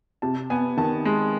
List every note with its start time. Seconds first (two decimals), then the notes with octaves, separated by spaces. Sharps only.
0.22 C3 A5
0.50 B3 G#5
0.77 D#3 A5
1.05 G#3